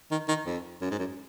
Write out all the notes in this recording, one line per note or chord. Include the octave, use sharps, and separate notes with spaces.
D#3
D#3
F2
F#2
G#2
F#2